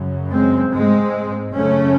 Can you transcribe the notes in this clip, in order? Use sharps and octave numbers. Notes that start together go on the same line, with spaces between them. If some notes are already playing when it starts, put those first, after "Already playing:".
Already playing: F#2 C#3
G#3 C4
G#2 G#3 C4
F#2 C#3 A3 C#4